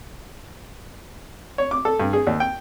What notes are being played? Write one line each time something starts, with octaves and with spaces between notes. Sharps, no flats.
C#5
D6
A4
G2
G#4
D#2
G5